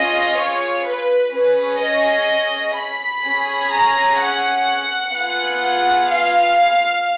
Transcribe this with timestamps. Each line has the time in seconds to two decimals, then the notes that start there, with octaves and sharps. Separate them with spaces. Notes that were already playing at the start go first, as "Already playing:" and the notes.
Already playing: C#4 F4 G#4 D#5
0.38 C#5
0.85 B4
1.32 C#4 G#4 B4
1.80 D#5
2.77 B5
3.23 C#4 G#4
3.72 A#5
4.20 F#5
5.14 B3 F4 G#4 F#5
6.10 F5